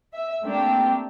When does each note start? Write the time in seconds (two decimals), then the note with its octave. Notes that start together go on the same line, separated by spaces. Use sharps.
0.13 E5
0.43 A3 A#3 C4 D4 G4